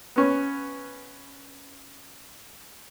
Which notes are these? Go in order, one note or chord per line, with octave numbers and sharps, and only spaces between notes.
B3 C#4